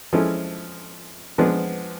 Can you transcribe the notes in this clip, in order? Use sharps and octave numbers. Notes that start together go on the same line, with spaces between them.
F3 G#3 C#4 E4 A4
F3 G#3 B3 D4